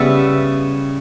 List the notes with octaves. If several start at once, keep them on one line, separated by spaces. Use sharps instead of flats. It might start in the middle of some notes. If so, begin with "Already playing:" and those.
Already playing: C#3 G3 B3 E5